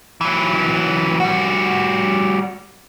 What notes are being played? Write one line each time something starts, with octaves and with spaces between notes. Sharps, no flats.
E3 F#3
G3 F#4